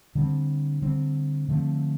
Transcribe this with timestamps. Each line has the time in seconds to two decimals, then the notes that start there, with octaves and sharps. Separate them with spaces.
0.15 D3 G3 C4
0.82 D3 G3 C4
1.48 D3 F3 A3 C4